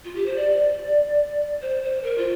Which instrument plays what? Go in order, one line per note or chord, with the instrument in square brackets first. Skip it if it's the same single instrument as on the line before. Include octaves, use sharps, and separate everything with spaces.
[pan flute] F4
G4
C5
D5
C5
C5
A#4
F4